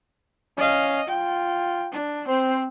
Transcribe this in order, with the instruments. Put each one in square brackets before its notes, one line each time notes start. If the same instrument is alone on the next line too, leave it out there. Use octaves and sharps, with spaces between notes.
[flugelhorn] C#4 [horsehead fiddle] D#5 F5
[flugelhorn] F4 [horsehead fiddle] G5
[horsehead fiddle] D4
[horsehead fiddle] C4 [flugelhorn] C5